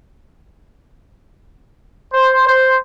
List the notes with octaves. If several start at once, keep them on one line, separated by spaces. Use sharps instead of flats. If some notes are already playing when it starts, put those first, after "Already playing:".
C5
C5